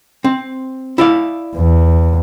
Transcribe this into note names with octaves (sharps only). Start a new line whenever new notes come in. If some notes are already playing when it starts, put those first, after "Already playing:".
C4
E4 D5 F5
E2